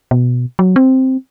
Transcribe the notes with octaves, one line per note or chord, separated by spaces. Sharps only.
B2
F#3
C4